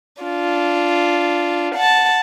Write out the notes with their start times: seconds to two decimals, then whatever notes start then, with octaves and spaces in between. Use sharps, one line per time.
0.23 D4 F4
1.75 F#5 A5